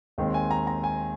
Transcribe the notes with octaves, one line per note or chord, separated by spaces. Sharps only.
D#2 D#3 G#3 C4
G#5
A#5
A#5
G#5